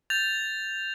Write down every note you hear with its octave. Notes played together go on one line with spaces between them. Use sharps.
G6 A6 F7